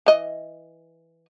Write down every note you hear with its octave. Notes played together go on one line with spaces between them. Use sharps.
E3 D#5